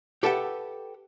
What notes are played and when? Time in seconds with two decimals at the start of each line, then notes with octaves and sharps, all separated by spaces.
0.23 G4 A4 B4 E5 F#5 G5